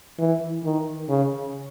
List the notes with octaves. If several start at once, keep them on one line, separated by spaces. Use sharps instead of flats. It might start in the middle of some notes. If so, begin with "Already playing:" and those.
E3
D#3
C#3